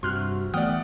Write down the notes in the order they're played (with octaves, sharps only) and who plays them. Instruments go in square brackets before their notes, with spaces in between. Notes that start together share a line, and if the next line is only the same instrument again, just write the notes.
[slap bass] G2 [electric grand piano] C3 [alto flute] F#4 [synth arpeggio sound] C6 F6 F#6
[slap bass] E3 B3 [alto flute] A3 [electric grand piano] D5 F#5 [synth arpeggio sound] G5 D#6 F6